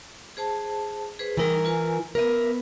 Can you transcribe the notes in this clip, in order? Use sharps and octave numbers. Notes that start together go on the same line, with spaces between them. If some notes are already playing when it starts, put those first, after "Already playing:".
G#4 C5 A5
G#4 B4 C5
E3 G3 D#4 A#4 A#5
F4 B4 G#5
B3 A#4 B4 E5